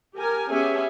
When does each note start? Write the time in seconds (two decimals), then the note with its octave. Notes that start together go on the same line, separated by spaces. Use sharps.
0.15 G4 A#4 G#5
0.51 B3 C#4 G4 G#4 E5 G#5